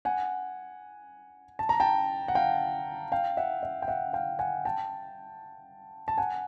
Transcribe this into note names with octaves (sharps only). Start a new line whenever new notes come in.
F#5 G#5
A5
A#5
G5 A5
F#5
F5 G5
F5 G5
E5 F#5
E5
G5
E5 F#5
F5 G5
F#5 G#5
G5 A5
A5
F#5 G#5